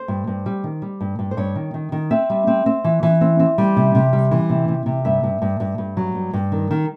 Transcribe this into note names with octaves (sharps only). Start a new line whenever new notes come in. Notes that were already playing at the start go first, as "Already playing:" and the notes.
Already playing: C5
G2
G2
G3
D#3
G3
G2
G2
C5
G2 C#5
D#3
D#3
D#3
C4 E5
G3
C4
C4
E3
E3
C4
C4
G3
C3
C3
G3
E3
C3
C3
C3
G2 E5
G2
G2
G2
G2
F#3
G2
G2
D#3
D#3